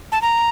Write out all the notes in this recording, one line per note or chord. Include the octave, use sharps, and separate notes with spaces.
A5
A#5